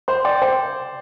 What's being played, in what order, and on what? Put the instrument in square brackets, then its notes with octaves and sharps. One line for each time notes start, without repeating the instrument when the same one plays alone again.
[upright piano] C5 [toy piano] C6
[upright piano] D5 [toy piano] G5
[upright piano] C5 [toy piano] G5